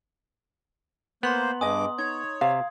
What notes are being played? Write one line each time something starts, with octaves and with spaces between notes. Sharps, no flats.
A#3 B3 C5 A#5 C6 F#7
G2 G#4 D#5 G#5 D6 D#6
D#4 C#5 G#6
C3 F5